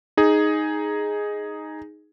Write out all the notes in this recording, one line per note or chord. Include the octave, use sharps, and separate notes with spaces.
D#4 G#4